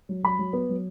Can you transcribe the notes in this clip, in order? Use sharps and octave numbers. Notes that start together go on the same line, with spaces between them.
F#3
F#3 B5
F#3
B3
F#3